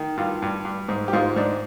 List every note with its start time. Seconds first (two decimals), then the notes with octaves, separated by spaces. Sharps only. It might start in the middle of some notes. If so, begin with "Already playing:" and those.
Already playing: D#3
0.17 G2 F4
0.42 G2
0.65 G2
0.89 G#2
1.08 G4
1.13 G#2 F4
1.36 G#2 D4